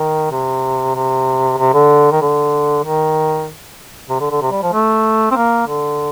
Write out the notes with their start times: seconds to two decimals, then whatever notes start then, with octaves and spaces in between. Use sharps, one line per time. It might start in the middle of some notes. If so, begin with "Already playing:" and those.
Already playing: D#3
0.32 C3
0.95 C3
1.58 C3
1.74 D3
2.12 D#3
2.21 D3
2.84 D#3
4.10 C3
4.20 D3
4.31 D3
4.41 C3
4.51 G3
4.63 F3
4.73 A3
5.31 C4
5.36 A#3
5.67 D3